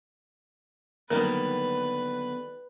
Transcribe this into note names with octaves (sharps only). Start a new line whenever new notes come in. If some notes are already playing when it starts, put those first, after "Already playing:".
D3 D#3 F#3 G3 A#3 B3 A#4 B4